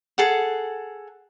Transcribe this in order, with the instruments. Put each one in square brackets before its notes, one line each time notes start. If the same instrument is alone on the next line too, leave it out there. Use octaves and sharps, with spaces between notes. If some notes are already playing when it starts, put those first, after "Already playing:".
[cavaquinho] G#4 A4 F#5